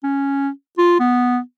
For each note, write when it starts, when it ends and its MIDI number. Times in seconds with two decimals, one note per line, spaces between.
0.04 0.49 61
0.78 0.97 65
1.00 1.39 59